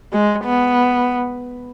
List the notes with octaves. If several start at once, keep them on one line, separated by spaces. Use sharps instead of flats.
G#3
B3